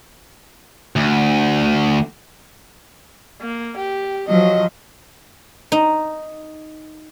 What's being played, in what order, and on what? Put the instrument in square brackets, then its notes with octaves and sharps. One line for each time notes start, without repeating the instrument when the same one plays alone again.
[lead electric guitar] D2
[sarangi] A#3
G4
[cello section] F3 F#3 [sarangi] D#5
[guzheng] D#4